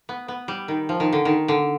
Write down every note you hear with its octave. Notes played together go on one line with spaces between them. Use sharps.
B3
B3
G3
D#3
F3
D#3
D3
D#3
D3